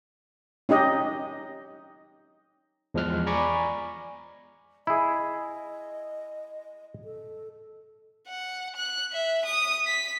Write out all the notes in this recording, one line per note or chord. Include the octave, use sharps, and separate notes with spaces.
C#4 D#4 G4 D#5
E2 F3 G#3 F6 F#6
D5 G#5 A#5 B5 C#6 D6
E4 G#4 D#5
A4
F#5
F#6
E5
D#6
B6